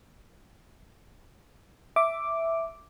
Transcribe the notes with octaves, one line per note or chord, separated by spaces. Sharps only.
E5 D6